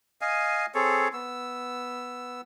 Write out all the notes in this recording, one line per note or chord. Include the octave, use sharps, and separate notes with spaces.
D#5 F5 G#5
C4 G#4 A4 C#5
B3 E6